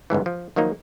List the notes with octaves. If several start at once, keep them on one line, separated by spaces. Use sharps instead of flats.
G1 C#2 G#2 E3
F3
D#3 F3 F#3 A#3 D#4